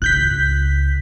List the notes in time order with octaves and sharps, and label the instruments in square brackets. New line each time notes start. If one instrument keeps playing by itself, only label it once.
[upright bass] C#2 C#3 [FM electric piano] F#6 G6 B6